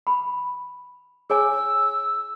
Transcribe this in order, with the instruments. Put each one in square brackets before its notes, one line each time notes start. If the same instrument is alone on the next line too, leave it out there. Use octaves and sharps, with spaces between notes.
[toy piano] B5
[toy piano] G#4 C#5 G#5 [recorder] E6